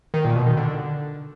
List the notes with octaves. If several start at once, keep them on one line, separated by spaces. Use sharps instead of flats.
D#3
A#2
B2
D#3
D3